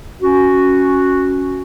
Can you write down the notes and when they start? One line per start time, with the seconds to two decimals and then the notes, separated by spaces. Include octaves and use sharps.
0.22 C#4 F#4